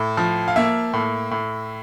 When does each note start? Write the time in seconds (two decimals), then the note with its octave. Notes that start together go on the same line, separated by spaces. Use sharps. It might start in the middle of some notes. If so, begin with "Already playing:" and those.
Already playing: A2
0.17 F3
0.48 F5
0.56 A#3 E5
0.93 A2
1.31 A2